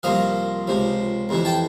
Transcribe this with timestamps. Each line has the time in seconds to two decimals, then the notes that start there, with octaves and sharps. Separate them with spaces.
0.03 C2 A#2 F3 D#5 F5
0.67 C#2 C3 F3
1.29 F2 C3 E3
1.45 G5 A5